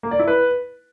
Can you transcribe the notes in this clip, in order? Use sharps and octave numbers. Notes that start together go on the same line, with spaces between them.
A#3
D5
E4
B4